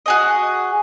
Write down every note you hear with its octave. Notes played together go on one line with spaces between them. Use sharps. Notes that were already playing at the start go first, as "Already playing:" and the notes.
F#4 G#4 D#5